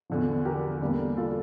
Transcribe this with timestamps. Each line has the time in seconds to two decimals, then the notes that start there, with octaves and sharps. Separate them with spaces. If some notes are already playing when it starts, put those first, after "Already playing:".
0.10 E2 D3 F3
0.45 G4 A#4
0.81 E2 D3 G3 A#3
1.17 F4 A4